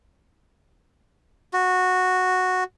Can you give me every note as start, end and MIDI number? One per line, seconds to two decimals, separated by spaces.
1.53 2.64 66